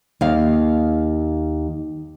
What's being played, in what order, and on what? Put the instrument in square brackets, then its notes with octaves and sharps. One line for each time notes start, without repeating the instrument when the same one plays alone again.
[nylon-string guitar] D#2 F5